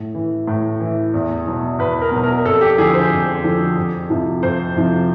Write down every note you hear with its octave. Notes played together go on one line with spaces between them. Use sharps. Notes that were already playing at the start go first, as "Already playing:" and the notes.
Already playing: A2
E3
A2
E3
E2
B2 F#3
E2 B4
A#4
B2 F#3
A#4
F2 A4
G4
D3 F3 G#4
C5
F2
D3 F3
F2
C3 F3
F2 C5
C3 F3